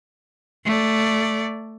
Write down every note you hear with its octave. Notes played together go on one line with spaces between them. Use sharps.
A3 D5